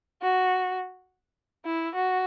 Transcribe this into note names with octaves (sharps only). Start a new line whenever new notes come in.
F#4
E4
F#4